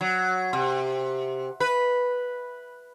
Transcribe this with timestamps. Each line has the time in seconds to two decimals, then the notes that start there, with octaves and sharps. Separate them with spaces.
0.01 F#3
0.53 C3
1.60 B4